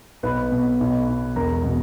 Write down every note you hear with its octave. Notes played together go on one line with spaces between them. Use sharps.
B1 B4 B5
B2
B1
B1
E1 A#4 A#5
B2